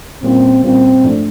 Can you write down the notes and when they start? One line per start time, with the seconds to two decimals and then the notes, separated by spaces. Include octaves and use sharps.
0.23 A#2 G3 A#3 C4 C#4 F4
0.63 A#2 G3 A#3 C4 C#4 F4
1.05 G#2 F3 A3 D4